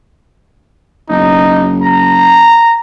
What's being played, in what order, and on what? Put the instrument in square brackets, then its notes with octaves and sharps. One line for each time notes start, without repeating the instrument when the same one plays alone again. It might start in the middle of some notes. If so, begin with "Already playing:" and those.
[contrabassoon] F#1 [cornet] D#4
[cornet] A#5